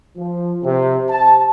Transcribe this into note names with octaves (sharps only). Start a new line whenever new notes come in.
F3
C3
A5